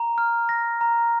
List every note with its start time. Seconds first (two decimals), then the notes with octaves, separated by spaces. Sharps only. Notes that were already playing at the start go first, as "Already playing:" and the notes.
Already playing: A#5
0.18 F6
0.49 A#6
0.81 A#5